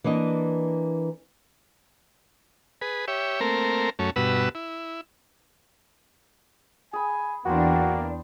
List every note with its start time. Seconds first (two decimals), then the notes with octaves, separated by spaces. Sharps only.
0.04 E3 A#3 D4 D#5
2.81 G#4 B4
3.08 G4 C#5 E5
3.41 A3 A#3 C4 A#4
3.99 F#2 A3 C#4
4.16 G2 B2 F#4 B4 E6
4.55 E4
6.93 G#4 G#5 B5
7.46 E2 A#3 D4 F#4 C5 G5